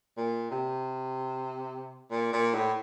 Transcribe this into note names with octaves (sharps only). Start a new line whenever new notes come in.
A#2
C3
A#2
A#2
A2